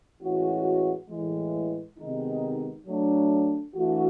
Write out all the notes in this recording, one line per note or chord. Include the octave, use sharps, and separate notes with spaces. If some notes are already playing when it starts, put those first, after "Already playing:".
A2 E3 G#3 C#4 F#4
A2 E3 G#3
C3 D#3 G#3 B3 D#4
F#3 A3 D4
E3 A3 D4 F#4